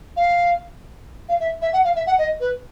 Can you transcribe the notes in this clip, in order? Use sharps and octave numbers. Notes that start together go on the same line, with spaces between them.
F5
F5
E5
E5
F#5
F5
E5
F#5
D#5
B4